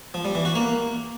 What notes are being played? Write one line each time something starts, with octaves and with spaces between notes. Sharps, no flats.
F3
G3
E3
F#4
A#3